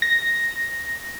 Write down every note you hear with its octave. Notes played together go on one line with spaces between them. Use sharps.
A#6